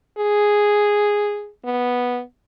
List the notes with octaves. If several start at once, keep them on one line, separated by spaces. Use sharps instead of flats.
G#4
B3